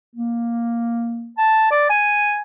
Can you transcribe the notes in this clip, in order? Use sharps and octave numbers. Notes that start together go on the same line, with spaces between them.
A#3
A5
D5
G#5